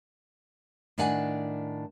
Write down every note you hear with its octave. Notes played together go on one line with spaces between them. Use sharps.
A2 D#3 D4 D5 F#5 G#5